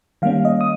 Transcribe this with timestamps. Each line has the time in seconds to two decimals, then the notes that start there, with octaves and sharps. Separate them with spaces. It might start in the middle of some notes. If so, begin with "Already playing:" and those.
0.22 D#3 G3 A#3 C#4 F5
0.45 D#5
0.61 D#6